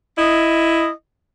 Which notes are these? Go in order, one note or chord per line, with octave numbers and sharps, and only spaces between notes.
E4 D#5